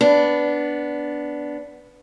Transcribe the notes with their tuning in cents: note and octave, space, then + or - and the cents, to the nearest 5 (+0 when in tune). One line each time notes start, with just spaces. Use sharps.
B3 +0 D4 -10